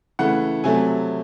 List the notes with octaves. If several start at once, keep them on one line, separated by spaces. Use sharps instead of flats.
C#3 E3 A3 F#5
C3 F#3 A3 G#5